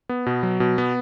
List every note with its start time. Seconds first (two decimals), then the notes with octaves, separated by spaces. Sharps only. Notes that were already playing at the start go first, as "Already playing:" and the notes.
0.09 B3
0.26 B2
0.43 F#3
0.60 B2
0.78 B3